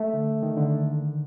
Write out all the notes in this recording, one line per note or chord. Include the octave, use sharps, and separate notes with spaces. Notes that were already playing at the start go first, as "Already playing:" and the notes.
Already playing: A3
D3
D#3
D3